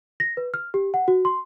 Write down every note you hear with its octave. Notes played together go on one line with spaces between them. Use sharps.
A#6
B4
F6
G4
F#5
F#4
C6